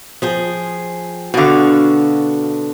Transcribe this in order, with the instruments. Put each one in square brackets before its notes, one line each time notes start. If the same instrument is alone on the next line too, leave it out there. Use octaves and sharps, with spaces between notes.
[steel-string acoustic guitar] F3 G#4 G5
[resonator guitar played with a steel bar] B2 D3 [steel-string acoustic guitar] F#4 F5